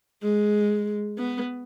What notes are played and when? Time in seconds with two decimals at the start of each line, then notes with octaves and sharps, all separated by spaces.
0.23 G#3
1.18 B3